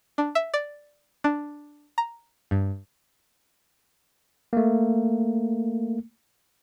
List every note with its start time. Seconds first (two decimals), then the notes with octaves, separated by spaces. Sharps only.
0.18 D4
0.35 E5
0.54 D5
1.24 D4
1.98 A#5
2.51 G2
4.53 A3 A#3